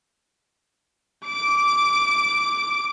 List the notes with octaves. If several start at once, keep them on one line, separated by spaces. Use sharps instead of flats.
D6 D7